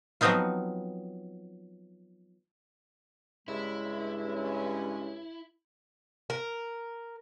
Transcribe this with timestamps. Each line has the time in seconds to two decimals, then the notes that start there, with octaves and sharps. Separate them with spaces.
0.21 F3 F#3 B3 C4 D#4 F4
3.48 G2 C#3 G#3 E4
4.24 C#4
6.30 A#4